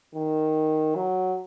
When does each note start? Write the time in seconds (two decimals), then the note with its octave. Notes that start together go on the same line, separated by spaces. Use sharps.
0.15 D#3
0.95 F#3